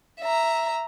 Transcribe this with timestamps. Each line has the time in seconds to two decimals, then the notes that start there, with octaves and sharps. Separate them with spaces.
0.21 E5 A#5